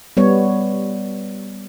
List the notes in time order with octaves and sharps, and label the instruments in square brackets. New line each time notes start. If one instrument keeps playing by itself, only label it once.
[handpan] G3 B3 C#5